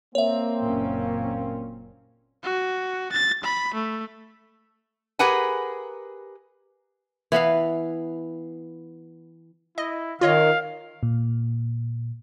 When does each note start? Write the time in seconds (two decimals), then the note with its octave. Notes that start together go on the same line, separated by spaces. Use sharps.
0.15 A#3 C4 C#5 E5
0.62 F#1 A#2 C#4
2.44 F#4
3.12 A6
3.44 B5
3.74 A3
5.19 G4 G#4 A#4 B4 F#5 G#5
7.32 E3 B3 B4 F5
9.78 E4 D#5
10.21 D#3 F4 C#5 D#5 F5
11.03 A#2